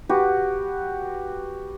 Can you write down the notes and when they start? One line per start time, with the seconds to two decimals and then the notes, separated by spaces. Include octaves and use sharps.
0.09 F#4 G4 B4